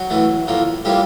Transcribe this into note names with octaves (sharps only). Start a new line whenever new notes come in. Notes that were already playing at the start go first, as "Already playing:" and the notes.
Already playing: F#3 F#4
A2 E3 A3
A2 F3 A#3
A2 F3 G3 A#3 G4